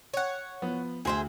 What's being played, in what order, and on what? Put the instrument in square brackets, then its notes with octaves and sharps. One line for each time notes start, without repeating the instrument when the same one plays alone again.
[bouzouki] C#5 F#5
[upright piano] F3 B3
[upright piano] D2 [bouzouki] G#4 C5 E5